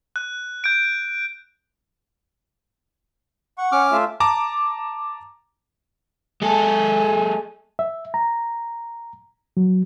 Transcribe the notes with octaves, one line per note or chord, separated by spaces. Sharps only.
F#6
G6 D7
F#5 C#6
C#4 D6 F6
A3 F4 E5
A5 A#5 D6
G#3 A4 G#5
E5
A#5
F#3